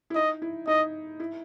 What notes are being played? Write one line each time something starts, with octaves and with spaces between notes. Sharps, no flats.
E4
D#4 D#5
E4
D#4 D#5
E4